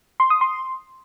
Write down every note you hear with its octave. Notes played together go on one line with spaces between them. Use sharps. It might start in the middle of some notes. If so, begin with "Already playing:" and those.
C6
D#6
C6